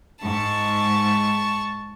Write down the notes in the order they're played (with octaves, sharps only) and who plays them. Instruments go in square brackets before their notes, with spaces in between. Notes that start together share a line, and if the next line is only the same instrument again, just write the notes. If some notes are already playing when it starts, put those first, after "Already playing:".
[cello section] G#2 [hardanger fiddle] A5 C#6